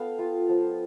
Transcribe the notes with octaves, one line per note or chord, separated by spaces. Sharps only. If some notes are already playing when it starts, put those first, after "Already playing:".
Already playing: B3 A4 F5 G5
F4
F3